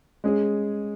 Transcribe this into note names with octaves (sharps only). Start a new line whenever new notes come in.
G#3 C#4 G#4